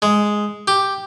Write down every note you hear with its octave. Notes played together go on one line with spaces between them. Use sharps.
G#3
G4